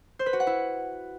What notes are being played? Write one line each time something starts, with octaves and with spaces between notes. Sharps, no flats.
C5
B4
F#4
F#5
E4